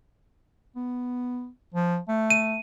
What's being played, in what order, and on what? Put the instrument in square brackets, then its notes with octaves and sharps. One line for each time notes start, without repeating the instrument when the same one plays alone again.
[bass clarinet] B3
F3
A3
[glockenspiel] D#7